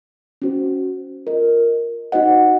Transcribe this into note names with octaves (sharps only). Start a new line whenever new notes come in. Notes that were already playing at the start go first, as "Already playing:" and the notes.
C#4 F#4 C5
F4 A#4 D#5
D#4 F#4 C5 D#5 F#5